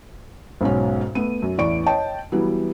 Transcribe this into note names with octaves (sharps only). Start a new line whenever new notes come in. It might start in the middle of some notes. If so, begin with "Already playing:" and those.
B1 G#2 B2 C#4
A3 B3 D#7
F#2
A1 E2 D5 C#6 D7
C#5 D#5 G5 A5
E3 F#3 G3 B3